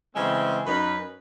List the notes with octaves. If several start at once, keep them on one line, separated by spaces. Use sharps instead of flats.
C#3 E3 G#3 A3 C4
F#2 C#4 D#4 B4 B5